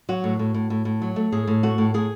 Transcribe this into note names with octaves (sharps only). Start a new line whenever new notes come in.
F#3 F#4
A2
A2
A2
A2
A2
F#3
A3
A2 G#4
A2
A3 F#4
A2
A2 G#4